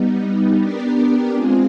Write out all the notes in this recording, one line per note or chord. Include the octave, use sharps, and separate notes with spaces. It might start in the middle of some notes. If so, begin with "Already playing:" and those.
Already playing: G3 B3 D#4
B3 D4 G4 A#4 D5
G#3 C4 F4 G#4